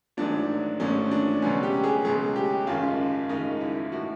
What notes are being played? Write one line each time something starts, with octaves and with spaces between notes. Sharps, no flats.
A1 G#2 D#3 F#3 D4
A1 G#2 D#3 F#3 C#4
D4
C#2 B2 F#3 C#4
G4
G#4
C#2 B2 F#3 G#4
G4
G#1 F#2 C#3 F4
G#1 F#2 C#3 D#4
E4
A2 E3 F#4